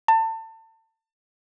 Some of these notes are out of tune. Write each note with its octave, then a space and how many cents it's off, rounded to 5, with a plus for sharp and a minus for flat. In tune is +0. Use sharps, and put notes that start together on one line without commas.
A5 +30